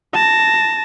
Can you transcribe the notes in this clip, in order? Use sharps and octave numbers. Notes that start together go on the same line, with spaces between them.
A5 A#6